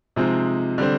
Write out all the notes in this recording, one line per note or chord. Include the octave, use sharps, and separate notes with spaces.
C3 F3 G#3 C4 D#4
D3 G3 C4